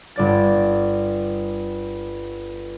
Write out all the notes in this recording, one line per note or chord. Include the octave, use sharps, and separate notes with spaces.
G1 D5 A6